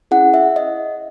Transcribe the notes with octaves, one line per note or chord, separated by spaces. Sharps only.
C#4 E4 G#4 F#5
E5
D#5